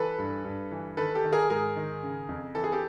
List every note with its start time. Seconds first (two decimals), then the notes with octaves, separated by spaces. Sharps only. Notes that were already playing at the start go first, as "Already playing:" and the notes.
Already playing: E3 A4 B4
0.18 G2
0.44 G2
0.71 E3
0.97 D#3 A4 B4
1.15 G4 A4
1.24 D#3
1.32 G#4 A#4
1.50 G#2 G#4 A#4
1.76 D#3
2.03 C#3
2.29 F2
2.55 E3 A4
2.64 G#4
2.72 G4 A4